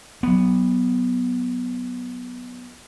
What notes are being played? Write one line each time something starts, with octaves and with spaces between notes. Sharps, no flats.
F#3 B3